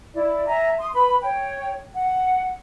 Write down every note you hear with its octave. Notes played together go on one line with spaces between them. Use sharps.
E4 D5
E5 G#5 A#5
C6 D#6
B4 B5
C#5 G5
F#5